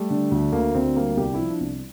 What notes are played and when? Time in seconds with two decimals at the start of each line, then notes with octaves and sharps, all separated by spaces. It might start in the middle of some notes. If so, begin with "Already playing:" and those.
Already playing: G3 A3
0.11 D3
0.32 D2
0.53 D2 A#3
0.75 D2 C4
0.96 G3 A#3
1.17 C2 G4
1.34 F3 E4
1.50 D4
1.61 C2